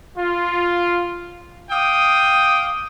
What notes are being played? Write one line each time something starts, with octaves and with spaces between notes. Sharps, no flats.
F4
F5 G5 D6 D#6